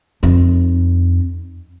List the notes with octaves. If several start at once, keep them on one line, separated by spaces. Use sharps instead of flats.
F2 D#4